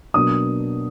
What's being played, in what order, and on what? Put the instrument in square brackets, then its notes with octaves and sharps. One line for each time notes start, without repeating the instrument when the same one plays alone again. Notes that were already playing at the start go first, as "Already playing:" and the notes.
[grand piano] B2 F#3 A#3 D4 D#6